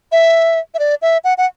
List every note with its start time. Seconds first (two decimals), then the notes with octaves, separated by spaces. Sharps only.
0.12 E5
0.74 E5
0.79 D5
1.02 E5
1.24 F#5
1.38 F#5